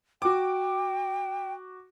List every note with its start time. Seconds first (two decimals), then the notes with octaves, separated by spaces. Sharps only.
0.22 F#4 G5 D6